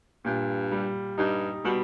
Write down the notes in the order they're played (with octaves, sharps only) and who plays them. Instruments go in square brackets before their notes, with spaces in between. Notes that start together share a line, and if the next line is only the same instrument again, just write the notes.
[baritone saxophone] G2 [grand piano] A#2
[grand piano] G3
[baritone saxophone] G2 [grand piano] D#4
[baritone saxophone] B2 [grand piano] G3